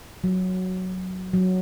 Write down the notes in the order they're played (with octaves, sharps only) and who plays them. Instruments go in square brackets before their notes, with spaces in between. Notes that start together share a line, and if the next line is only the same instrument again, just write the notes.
[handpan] F#3
F#3